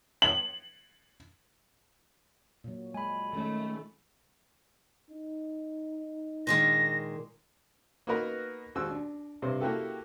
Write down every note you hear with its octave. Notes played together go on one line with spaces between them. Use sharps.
F#7
A#2 F#3
G#3 G#5 B5
D#3 G#3 A3 C#4
D#4
A#2 D#3 G#3 A#6
A#3 B3 D#4 F#4 A#4 B4
D#2 G#3 F#4 C5 E6
D4
G2 C3 C5
A#3 E4 F#4 G4 A4